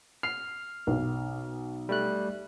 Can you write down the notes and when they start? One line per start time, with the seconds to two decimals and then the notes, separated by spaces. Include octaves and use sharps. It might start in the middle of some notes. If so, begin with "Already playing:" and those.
0.23 F6 C7
0.87 B1
1.89 G3 A3 F#6